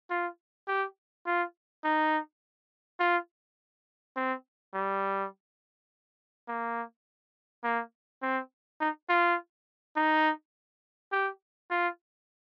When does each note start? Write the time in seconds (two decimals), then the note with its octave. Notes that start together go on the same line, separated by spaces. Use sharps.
0.10 F4
0.68 G4
1.26 F4
1.84 D#4
3.00 F4
4.16 C4
4.74 G3
6.48 A#3
7.64 A#3
8.22 C4
8.81 D#4
9.09 F4
9.96 D#4
11.12 G4
11.70 F4